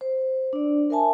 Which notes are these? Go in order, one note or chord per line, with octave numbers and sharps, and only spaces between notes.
C5
D4 D5
A#4 E5 G#5 A5